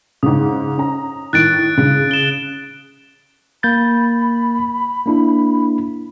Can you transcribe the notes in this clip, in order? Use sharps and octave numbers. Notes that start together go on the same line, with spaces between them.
G#2 C#3 D#6
C#4 A#5
A2 D#3 F#6 A6 D7
C#3
E7 G7
A#3 B5 G6 A6
A#3 D4 E4